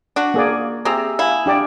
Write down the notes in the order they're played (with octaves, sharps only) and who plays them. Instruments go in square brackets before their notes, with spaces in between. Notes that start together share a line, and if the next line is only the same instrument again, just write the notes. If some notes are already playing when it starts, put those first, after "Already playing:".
[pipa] D4 F#4
[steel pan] A#3 G#4 D5
[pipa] C4 [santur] G4 G#4 E5 [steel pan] A#5
[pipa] E4 [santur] F5 G#5
[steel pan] D4 G4 D5